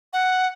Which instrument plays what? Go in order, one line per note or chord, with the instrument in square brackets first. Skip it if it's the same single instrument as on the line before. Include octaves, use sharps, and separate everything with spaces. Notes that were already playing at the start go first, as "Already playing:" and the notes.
[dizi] F#5